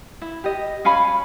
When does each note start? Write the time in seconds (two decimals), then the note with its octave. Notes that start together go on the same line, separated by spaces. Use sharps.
0.22 E4
0.44 G4 D#5
0.85 C#4 F5 G#5 B5